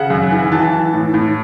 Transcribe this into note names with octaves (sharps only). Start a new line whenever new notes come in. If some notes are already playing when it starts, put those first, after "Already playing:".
Already playing: C#3 F#5
F#2
E3
E3 A5
E3
A2
A2